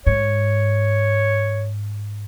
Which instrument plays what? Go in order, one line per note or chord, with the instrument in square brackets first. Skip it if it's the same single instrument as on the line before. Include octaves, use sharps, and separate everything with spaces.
[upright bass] G#2 [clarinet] C#5